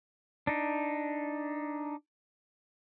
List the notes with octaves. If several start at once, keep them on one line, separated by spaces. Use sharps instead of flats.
D4 D#4